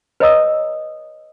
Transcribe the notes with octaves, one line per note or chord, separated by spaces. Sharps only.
B4 C#5 D#5 A#5 D#6 E6